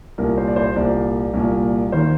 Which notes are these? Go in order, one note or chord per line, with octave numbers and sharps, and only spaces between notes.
C2 A#2 A#4
C5
D5
C5
C2 A#2 D5
C2 A#2
D#2 D#3 C5